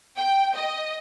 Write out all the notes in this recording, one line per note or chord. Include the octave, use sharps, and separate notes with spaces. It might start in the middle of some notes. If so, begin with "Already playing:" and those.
G5
D#5